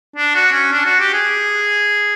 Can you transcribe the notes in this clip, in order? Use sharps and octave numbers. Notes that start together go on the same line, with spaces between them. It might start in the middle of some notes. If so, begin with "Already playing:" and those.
D4
F#4
C#4
D4
F#4
G4
G#4